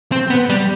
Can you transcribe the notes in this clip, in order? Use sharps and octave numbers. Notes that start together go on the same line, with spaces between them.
C4
B3
G3